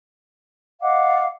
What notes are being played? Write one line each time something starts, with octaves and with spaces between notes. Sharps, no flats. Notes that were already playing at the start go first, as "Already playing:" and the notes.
D#5 F5 F#5 D6